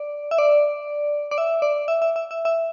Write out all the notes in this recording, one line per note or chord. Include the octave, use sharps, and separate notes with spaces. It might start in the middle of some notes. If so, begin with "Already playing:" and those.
Already playing: D5
E5
D5
D5
E5
D5
E5
E5
E5
E5
E5